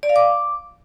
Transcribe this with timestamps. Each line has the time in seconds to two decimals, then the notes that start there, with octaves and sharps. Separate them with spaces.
0.03 D5
0.09 F5
0.16 D6